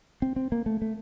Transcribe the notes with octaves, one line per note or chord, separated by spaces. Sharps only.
C4
C4
A#3
A3
A3